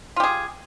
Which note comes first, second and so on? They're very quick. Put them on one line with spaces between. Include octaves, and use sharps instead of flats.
F4 G4 G#4